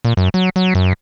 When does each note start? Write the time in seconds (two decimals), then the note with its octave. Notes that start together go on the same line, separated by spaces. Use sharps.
0.05 A#2
0.17 F#2
0.34 F#3
0.56 F#3
0.75 F#2